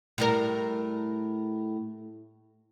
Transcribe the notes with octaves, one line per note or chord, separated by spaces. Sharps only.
A2 G3 A#4